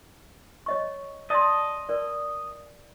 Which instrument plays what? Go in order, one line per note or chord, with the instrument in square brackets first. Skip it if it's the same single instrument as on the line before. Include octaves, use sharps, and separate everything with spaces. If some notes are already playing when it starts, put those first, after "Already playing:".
[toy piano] C#5 D#5 C#6
[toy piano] D5 C6 [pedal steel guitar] D#5 A5
[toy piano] A#4 D5